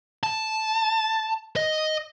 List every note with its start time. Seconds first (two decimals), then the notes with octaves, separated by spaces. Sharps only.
0.23 A5
1.56 D#5